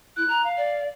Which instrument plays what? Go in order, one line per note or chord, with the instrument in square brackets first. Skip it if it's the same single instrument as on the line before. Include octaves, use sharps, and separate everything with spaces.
[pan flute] E4 [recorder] F#6
[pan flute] A#5
[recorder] F5
[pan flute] D5